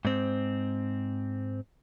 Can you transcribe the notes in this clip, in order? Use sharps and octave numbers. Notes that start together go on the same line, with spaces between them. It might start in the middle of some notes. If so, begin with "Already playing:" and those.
G#2 C4